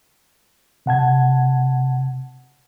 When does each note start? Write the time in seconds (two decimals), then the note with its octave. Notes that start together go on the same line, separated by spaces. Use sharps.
0.86 C3 F#5 A5 G#6